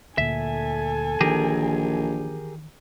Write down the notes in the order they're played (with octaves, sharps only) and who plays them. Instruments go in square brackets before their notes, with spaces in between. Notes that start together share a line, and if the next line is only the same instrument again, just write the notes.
[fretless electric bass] D2 A#2 [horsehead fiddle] A4 G#5 [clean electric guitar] E5
[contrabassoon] A#1 [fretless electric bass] D#3 E3 [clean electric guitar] G4 G#4 A#4